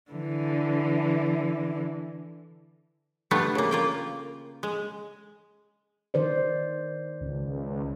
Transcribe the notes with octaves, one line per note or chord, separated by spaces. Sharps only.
D3 E3
D3 G3 A3 B3 F4
C#3 A#3
A#3 F4 G5
G#3
D#3 C5 D5
C#2